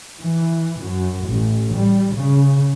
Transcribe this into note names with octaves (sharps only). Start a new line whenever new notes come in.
E3
F#2
A1
G3
C#3